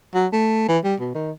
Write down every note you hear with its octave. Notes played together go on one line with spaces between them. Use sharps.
F#3
A3
E3
G3
B2
D#3